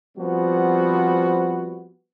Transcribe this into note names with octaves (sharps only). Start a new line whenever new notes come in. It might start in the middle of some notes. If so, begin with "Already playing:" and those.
F3 G3 B3 C4 F#4